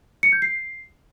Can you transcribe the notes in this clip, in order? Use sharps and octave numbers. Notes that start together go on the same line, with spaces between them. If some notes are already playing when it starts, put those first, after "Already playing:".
C#7
G6
C7